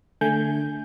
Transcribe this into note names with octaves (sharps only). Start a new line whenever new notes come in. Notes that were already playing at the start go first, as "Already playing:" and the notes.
D3 A3 G#5 G6